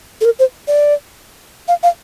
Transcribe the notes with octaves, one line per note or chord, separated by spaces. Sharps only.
A4
A#4
C5
D5
F5
F5